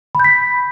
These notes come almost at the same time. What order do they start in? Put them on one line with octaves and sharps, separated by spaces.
B5 G6 B6